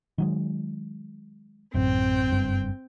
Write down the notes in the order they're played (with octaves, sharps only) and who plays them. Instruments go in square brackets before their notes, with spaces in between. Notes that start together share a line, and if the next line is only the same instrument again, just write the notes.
[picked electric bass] D#3 F#3 G#3
[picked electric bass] A1 F#2 [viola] C4 G5
[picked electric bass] F#1 G2